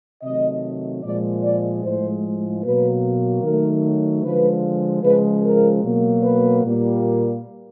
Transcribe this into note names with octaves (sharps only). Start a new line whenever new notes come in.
C3 D#3 F#3 A3 D#5
A#2 F3 G#3 D5
D5
A2 F3 G#3 C5
B2 F#3 A#3 B4
D#3 F#3 A3 A#4
D3 F3 G#3 B4
C#3 F3 G#3 B4
A#4
B2 F#3 A#3
B4
A#2 G3 A#3